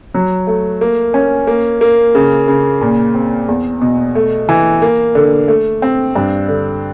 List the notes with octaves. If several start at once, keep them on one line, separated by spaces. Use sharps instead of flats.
F#3
A3
A#3
C#4
A#3
A#3
C#3
C#3
A#2
C4
E2
B2
A3
E3
A#3
D3
A3
C4
G2
D3